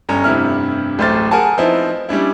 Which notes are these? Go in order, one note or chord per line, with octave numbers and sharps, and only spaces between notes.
G1 C#4 A#5
F1 G2 C3 E4 F6
D1 A1 A3 C5 F6 A6
G#4 A#4 F#5 G#5 A5
F3 B3 C4 D#4 E4
G3 C#4 D4 E4